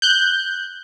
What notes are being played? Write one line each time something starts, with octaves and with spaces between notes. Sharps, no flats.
F#6 G6